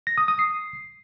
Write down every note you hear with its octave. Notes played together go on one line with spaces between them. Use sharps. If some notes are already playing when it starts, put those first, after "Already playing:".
A#6
D#6
D#6
C7